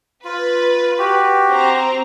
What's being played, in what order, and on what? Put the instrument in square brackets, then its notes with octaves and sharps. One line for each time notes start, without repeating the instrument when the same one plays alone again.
[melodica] F4 [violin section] B4
[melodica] F#4 G4
[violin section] C4 A#5